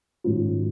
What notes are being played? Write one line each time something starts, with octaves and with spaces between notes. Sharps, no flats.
G#2 D#3 F#3 C#4 F4